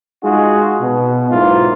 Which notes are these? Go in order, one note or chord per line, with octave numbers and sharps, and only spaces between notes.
G#3 D#4 F4 F#4 G#4
B2
B1 G#2 A#3 E4 F4